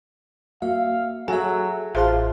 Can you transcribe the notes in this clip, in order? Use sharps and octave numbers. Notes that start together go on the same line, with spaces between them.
A#3 F#4 E5 F5
F#3 F#4 G#4 A4 E5 G#5
A1 F4 G#4 C5 E5 F5 A5